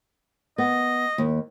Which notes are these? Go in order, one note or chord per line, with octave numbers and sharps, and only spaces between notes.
B3 D#5
D#2